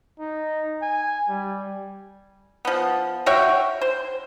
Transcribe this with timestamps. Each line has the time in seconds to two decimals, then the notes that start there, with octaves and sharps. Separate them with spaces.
0.19 D#4
0.82 G#5
1.29 G3
2.65 F3 B3
3.26 F#4 C#5 E5 G5
3.81 C5